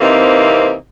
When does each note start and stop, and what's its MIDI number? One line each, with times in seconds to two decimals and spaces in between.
0.01 0.73 48
0.01 0.73 52
0.01 0.73 58
0.01 0.73 60
0.01 0.73 63